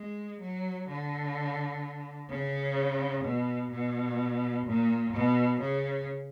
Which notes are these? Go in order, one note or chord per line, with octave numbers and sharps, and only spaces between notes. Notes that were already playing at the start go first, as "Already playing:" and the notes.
Already playing: G#3
F#3
D3
C#3
B2
B2
A#2
B2
C#3